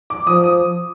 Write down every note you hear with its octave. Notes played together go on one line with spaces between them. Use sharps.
D6
F3 D#6
D#6